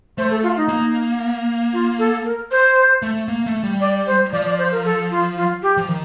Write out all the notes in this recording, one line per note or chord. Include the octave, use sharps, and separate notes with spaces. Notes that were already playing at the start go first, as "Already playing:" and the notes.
A3 C5
A4
F4
D#4
A#3
F4
A4
A#4
C5
A3
A#3
A3
G3
D5
C5
F3 D5
D5
C5
A#4
A4
F4
F4
G4
F3
D#3